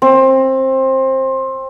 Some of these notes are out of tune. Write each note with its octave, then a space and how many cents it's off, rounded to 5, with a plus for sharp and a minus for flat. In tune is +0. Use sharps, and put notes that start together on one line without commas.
C4 +20